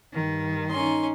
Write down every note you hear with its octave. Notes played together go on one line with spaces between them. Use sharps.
G2 D#3
C#4 D#4 C6